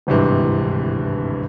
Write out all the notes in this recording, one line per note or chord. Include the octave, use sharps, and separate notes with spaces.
D1 G#1 G2 C3 E3